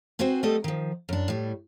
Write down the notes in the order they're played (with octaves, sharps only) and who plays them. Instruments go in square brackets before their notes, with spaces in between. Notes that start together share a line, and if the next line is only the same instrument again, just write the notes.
[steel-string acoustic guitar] C4 F#4 B4 C5 G#5
G3 A3 B3 G4 A4 D#5
D#3 F3
F#2 D4
A2 G3